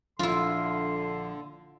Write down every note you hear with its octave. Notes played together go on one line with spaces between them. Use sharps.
A#1 D3 E4 F4 C6